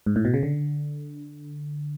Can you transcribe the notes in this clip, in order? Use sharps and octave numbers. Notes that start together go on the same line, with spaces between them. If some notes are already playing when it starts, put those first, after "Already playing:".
G#2
A2
B2
C#3
D3